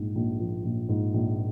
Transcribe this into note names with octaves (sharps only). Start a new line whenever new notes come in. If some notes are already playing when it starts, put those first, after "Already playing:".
Already playing: A#1 G#2
A#1
F3
A#1
G#2
A#1